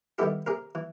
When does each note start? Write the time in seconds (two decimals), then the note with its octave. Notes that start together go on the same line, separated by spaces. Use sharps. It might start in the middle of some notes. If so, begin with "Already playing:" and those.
0.18 D#3 G3 B3 E4 G4 A4
0.46 C3 G#4 A#4
0.75 E3